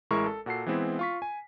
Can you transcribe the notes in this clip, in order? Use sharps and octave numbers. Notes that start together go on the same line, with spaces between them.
A1 G#3 E4 A#4 C#6
A4
A#2 F#4 A4 C7
E3 G#3 B3 C4 E4
F4 C#6 B6
G#5